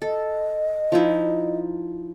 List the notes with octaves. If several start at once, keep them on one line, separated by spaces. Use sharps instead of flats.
A4 D#5
F3 D#4 E4